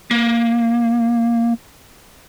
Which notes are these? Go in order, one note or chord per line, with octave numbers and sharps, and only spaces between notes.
A#3